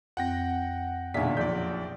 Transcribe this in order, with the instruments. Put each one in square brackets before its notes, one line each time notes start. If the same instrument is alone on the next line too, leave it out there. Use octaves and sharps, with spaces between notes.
[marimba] F2 C4 [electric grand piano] F#5 G5 A#6
[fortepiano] B1 E2 [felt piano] A#2 D3 G#5 [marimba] E5 [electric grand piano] B6
[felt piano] A#1 [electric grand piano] D5 G6